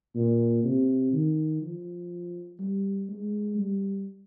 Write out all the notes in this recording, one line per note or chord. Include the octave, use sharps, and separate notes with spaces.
A#2
C3
D#3
F3
G3
G#3
G3